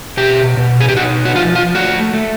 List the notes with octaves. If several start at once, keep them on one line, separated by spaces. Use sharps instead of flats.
B2 G4
B2
G#4
G4
D#4 F#4
F#4
F3 F4
F4
A3 F#4
A3